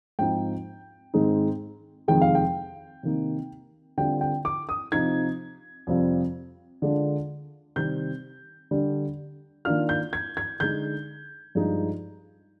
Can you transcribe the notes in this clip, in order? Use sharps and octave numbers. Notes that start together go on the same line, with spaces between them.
G#2 F3 C4 D#4 G5
G#2 D#3 G#3 C4 D#4
F2 C3 D#3 G#3 G5
F5
G5
C3 D#3 A#3 D#4
D3 G3 C4 F4 G5
G5
D6
D#6
C3 F3 C4 D#4 G#6
F2 C3 G3 C4 F4
D3 G#3 D4 F4
C3 D#3 G3 C4 G6
D3 G3 D4
D#3 A#3 D4 F4 F6
G6
G#6
G#6
D3 G#3 D#4 G6
G2 F3 G#3 D#4